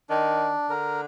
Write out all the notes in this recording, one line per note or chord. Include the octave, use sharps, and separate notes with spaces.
D#3 D4
D3 A#4